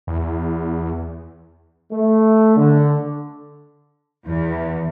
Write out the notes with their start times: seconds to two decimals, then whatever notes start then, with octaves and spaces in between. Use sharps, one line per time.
0.07 E2
1.91 A3
2.56 D3
4.26 E2